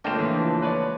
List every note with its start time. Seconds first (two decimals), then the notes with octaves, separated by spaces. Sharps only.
0.05 C#2 A3 A#3 D4 G5 A5 E7
0.19 E3 F3
0.62 B4 C#5 D5